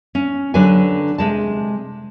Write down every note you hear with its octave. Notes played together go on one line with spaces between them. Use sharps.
C#4
D3 F#3 D4 G4 B4 G#5
C3 G#3 A5